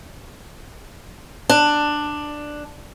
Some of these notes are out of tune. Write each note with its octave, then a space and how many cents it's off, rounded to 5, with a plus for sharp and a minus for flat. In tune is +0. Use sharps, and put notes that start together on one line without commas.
D4 +10